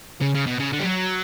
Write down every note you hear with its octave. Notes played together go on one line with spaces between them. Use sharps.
C#3
C#3
B2
C#3
D3
G3
F#3